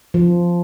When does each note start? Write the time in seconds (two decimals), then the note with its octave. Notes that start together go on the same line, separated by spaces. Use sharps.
0.14 F3